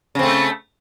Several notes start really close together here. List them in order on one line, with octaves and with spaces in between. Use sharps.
C#3 C4 A3